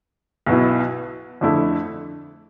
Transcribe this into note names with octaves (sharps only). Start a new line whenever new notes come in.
B1 B2 B3 E4
F2 D3 A3 E4